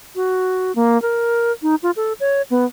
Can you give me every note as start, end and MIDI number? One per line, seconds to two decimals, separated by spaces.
0.16 0.75 66
0.75 1.00 58
1.02 1.52 70
1.63 1.75 63
1.83 1.91 65
1.96 2.13 69
2.20 2.42 73
2.50 2.65 59